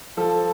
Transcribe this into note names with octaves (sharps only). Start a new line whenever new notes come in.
F3 A4